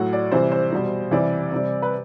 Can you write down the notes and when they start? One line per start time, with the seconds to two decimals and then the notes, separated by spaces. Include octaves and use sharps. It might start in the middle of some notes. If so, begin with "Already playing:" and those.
Already playing: A2 F#3 F#5
0.13 D5
0.32 C3 E3 G3 C5
0.52 C5
0.72 B2 G3
1.11 C3 E3 G3 D5
1.52 C3 G3
1.82 B4